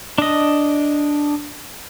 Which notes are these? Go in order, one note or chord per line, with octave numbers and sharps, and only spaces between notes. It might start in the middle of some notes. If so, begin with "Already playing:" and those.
D4 D#5